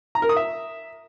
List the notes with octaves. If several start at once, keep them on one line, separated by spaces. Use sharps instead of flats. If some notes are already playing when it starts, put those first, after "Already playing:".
A#5
A#4
D#6
E5